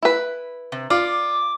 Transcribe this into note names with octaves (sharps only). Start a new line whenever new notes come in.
E4 B4
C3
F4 D5 D6